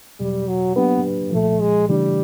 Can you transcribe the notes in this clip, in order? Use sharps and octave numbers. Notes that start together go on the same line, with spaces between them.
E2 B2 F#3 G3
F#3
F#3 A#3 B3 D4 G4 B4
C2 A#2 F3 A3
G#3
C#3 E3 G3 A3 D4